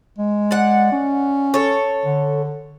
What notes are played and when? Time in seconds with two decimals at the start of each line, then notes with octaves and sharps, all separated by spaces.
0.18 G#3
0.51 D5 F#5
0.92 C#4
1.54 A4 C#5
2.05 D3